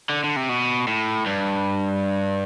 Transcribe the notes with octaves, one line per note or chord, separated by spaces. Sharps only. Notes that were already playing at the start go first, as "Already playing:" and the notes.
D3
D3
C3
B2
A2
G2